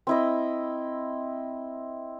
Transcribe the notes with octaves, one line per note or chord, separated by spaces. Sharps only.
C4 E4 D#5